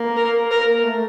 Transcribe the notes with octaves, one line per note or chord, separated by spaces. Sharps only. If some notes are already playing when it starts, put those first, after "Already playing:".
Already playing: A#3
A#4
A#4
A#3
A3